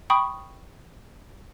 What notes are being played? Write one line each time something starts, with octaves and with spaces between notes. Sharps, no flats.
G5 B5 C#6 D#6